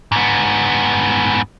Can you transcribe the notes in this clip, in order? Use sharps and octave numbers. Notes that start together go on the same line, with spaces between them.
G#2 B3